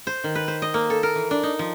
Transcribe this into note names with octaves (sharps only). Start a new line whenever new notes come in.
C5
D#3
B4
C5
D#5
A#3
A4
A#4
E3
D4
D#4
F3